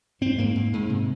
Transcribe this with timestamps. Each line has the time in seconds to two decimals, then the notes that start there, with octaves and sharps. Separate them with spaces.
0.21 G#2 C4
0.38 G#2 A#3
0.55 G#2
0.73 G#2
0.89 C3